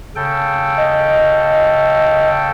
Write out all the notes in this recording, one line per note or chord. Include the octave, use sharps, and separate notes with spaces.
C#3 A4 G5
D#5